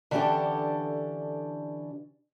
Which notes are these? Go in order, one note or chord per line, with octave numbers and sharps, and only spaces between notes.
D3 E3 C#4 D4 G4 A4